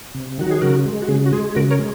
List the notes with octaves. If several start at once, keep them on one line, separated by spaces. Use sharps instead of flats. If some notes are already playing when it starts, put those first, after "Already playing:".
C3
D#3 F#3 F#4
G#4
C#3 F#4 A#4
G#3
F#4
C#3 G#4
F#4
G#3 G#4
C#3 F#4 A#4
A#4 C#5
G#3